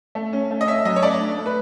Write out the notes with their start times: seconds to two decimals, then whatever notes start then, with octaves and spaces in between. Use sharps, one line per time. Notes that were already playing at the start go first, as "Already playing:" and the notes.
0.15 A3
0.33 C#4
0.51 A3
0.61 D#5
0.67 C#4 E5
0.85 F#3 D#5
0.96 C#5
1.02 A3 D5
1.20 D4
1.37 A3
1.46 B4